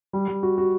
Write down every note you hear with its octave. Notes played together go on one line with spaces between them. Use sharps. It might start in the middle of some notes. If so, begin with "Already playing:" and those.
G3
G3
F#4
F#4